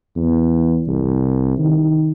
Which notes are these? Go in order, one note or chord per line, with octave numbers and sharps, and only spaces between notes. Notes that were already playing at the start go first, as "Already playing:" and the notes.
E2
C2
D#3